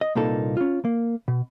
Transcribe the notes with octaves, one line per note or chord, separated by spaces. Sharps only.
D#5
C2 A#2 A#3 D#4 A4 B4
C#4 F4
A#3
B2